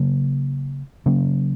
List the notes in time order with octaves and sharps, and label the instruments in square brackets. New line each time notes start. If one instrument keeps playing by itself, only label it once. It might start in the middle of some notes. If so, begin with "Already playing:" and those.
Already playing: [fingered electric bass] C#3 F#3 A#3
C#3 F#3 A#3 C#4